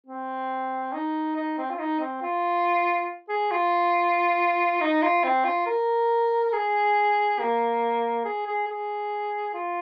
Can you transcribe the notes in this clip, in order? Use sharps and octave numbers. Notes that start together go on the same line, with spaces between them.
C4
D#4
D#4
C4
F4
D#4
C4
F4
G#4
F4
D#4
F4
C4
F4
A#4
G#4
A#3
G#4
G#4
G#4
F4